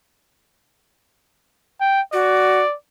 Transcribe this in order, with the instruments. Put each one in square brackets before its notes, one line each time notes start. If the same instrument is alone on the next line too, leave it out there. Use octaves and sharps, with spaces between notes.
[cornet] G5
[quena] F#4 [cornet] D5